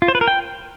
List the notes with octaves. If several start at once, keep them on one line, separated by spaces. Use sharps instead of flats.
F4
C5
B4
A#4
G5